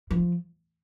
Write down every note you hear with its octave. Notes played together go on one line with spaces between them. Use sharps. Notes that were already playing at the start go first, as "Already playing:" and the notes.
F3